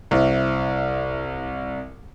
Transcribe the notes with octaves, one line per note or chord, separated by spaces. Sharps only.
C2 E4 C5 E5